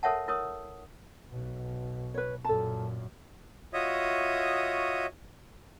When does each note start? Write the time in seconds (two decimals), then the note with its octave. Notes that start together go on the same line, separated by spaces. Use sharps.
0.03 A4 A#4 C#5 E5 F#5 A5
0.28 E4 A#4 C#5 D#6
1.31 B1 B2
2.14 B4 C#5
2.45 F#2 A#2 A4 A5
3.73 F4 F#4 C#5 D#5 E5 D#6